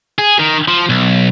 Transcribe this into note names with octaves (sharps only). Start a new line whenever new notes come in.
G#4
D#3
F3
B1